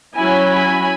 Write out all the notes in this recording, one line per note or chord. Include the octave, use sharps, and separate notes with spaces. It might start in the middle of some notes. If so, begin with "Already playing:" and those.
F#3 C#4 E4 G#5 B5
G#5 B5